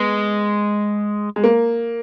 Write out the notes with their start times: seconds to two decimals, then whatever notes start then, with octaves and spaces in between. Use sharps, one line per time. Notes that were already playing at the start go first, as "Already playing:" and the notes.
Already playing: G#3 B3
1.36 G#3
1.44 A#3